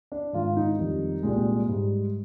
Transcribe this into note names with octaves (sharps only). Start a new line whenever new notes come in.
D4
G#2 D#3 G#3 F4
D#4
F2 D#3 G3
C2 A#2 G#3
G#2 G3